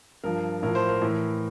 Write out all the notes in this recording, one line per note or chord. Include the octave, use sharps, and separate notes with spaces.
G2 F3 A#4
A2 F3 A#4
C5
A#4
A2 E3